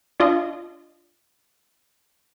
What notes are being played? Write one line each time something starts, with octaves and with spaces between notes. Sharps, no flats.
D4 F4 D#5